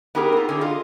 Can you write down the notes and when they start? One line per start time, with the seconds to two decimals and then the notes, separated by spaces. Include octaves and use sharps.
0.15 B3 D#4 G4 G#4 A#4
0.32 C4 F4
0.49 D3 G#4
0.61 F4 D#5